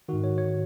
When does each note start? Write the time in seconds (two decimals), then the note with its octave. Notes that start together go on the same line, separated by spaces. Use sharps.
0.09 G#2 D#3 F#4
0.24 C#5
0.38 C#5